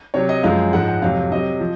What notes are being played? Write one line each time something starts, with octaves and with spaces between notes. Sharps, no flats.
C3 F#3 C#5
D#5
F#2 F3 G#3 F5
G#2 F3 G#3 F#5
F#5
F2 C3 F#3 F5
C3 F#3 D#5
F3